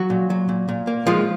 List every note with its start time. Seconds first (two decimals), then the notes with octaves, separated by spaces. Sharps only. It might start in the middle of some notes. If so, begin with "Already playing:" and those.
Already playing: F#3 F#4
0.10 A#2
0.30 F#3
0.49 A#2
0.68 A#2
0.87 A#3
1.07 F3 G#3 F4